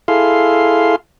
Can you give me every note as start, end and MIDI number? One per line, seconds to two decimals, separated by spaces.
0.08 0.96 64
0.08 0.96 68
0.08 0.96 69
0.08 0.96 77
0.08 0.96 84